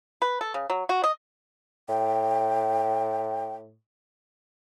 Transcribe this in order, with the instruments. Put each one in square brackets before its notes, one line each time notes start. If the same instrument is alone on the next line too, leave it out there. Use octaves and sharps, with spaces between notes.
[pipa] B4
A4
C#3
F#3
F#4
D#5
[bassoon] A2 [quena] G5